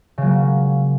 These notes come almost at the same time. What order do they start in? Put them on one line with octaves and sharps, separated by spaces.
C#3 F#3 A#3